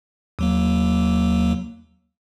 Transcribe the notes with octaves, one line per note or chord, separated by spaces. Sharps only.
D#2 F#3 A#3